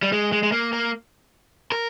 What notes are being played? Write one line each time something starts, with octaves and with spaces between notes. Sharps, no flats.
G3
G#3
G#3
G#3
A#3
A#3
A#4